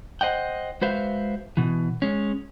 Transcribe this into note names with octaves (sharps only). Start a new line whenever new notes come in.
C5 D#5 F#5 G5
G#3 F#4 B4 C5 E5 F5
B2 E3
G#3 C#4